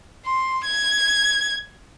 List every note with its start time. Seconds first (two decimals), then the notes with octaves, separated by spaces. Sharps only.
0.26 C6
0.64 G#6